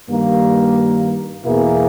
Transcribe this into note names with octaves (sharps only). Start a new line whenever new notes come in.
G2 D#3 A#3
E2 B2 A#3 E4 G#4